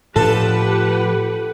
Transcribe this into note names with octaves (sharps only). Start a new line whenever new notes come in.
A2 F3 D4 G4 A4 B4 F#5